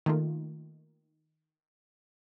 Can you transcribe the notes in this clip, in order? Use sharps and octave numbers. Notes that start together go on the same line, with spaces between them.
D#3 A3 A#3 F4